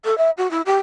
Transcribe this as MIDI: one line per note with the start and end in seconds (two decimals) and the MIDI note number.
0.05 0.17 69
0.18 0.30 76
0.37 0.50 66
0.51 0.62 64
0.66 0.77 67